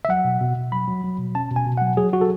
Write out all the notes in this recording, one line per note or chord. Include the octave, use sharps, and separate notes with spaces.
E5
F#3 F#5
B2
B2
B2
F#3 B5
F#3
F#3
B2
C#4 A5
B2
G#5
B2
F#3 F#5
F#3 G#4
F#3 F#4
A4